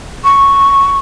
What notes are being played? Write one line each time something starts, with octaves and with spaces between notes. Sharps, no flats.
C#6